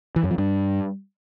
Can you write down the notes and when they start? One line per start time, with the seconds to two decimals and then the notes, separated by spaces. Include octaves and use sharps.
0.16 E3
0.23 F#2
0.31 F3
0.38 G2